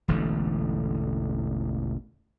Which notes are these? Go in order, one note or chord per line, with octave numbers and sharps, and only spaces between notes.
E1 A1 D3 A3